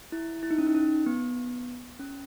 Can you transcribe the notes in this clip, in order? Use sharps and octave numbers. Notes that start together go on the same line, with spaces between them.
E4
E4
D#4
C#4
D#4
C#4
B3
C#4